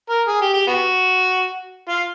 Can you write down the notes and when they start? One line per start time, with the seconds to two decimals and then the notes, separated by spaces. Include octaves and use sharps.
0.10 A#4
0.28 G#4
0.41 G4
0.54 G4
0.67 B3 F#4
1.89 F4